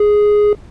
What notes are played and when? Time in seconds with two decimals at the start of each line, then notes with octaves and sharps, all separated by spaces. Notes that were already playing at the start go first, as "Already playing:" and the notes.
Already playing: G#4